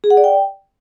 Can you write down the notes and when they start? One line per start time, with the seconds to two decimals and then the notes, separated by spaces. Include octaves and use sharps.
0.04 G#4
0.10 F#5
0.17 D5
0.24 G5